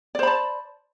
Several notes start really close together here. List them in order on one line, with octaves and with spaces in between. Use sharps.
D5 C5 B5 A5